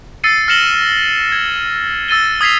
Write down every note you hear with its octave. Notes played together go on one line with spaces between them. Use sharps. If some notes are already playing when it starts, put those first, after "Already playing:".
E6 A6 C7 C#7 D#7
F6 A#6 C#7 E7 F#7 G7
G#6
E6 A6 D#7 G7
D#6 G#6 B6 C7 F7